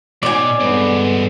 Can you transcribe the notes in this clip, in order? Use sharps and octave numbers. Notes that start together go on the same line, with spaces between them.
B2 D#4 C#5 D5 G#5
G2 D3 G#3 B3 C4